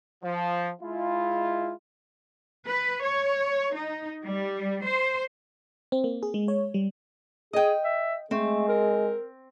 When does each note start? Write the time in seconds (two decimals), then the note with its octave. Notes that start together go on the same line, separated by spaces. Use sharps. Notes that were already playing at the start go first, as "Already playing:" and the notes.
0.23 F3
0.81 G#3 E4 F4
2.66 B4
3.03 C#5
3.74 D#4
4.25 G3
4.85 C5
5.92 C4
6.04 A#3
6.23 G#4
6.34 G#3
6.48 C#5
6.74 G3
7.53 G#4 D#5 G5
7.84 E5
8.31 G#3 A3 C4
8.68 A#4